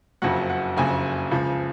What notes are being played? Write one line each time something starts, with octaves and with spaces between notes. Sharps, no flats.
F#1 F2 C#3 F#3 F#5
F#5
F#1 F2 C#3 F#3 G#5
C#2 C#3 F3